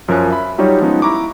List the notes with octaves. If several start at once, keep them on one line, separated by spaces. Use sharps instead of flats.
F#2 F3 C#4 A#4 G#5 F#6
E5 B5
F#3 G3 D#4 F4 G4 C#5
F3 G#3 B3 C#4 D#4
E4 A#5 C#6 D6